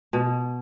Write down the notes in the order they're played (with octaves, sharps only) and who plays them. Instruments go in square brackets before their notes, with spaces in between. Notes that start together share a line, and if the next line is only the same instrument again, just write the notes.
[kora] B2